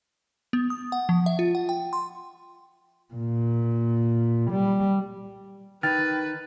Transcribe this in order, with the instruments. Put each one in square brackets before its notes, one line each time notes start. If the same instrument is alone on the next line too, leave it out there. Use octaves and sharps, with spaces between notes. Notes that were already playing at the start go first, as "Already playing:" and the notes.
[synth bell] B3
D#6
F#5
F3
E5
F4
F#5
G5
C6
[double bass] A#2
G3
[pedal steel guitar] D#3 [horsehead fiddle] B4 [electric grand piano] G5 F6 [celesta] A6